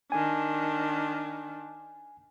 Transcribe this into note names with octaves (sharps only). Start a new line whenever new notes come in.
D#3 D4 G#5